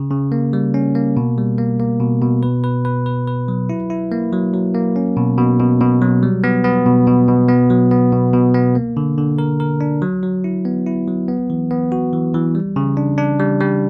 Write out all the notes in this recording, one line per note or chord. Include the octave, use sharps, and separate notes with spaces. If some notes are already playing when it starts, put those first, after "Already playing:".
Already playing: C#3
C#3
A#3
G3
C#4
A#3
B2
G3
A#3
A#3
B2
B2
B4
B4
B4
B4
B4
F#3
E4
E4
A#3
F#3
F#3
A#3
C#4
B2
B2
B2
B2
F#3
G3
B3
B3
B2
B2
B2
B3
F#3
B3
B2
B2
B3
A#3
D3
D3
A#4
A#4
D4
F#3
F#3
E4
B3
E4
F#3
B3
E3
B3
F#4
E3
E3
G3
C#3
D4
D4
G3
G3